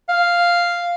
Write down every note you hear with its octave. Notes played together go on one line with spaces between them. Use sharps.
F5